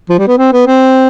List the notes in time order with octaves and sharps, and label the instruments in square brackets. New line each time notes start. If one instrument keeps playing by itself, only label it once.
[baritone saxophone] F3
G3
B3
C4
B3
C4